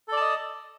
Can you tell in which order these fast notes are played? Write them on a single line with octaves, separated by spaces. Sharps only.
A4 D5 A5 D#5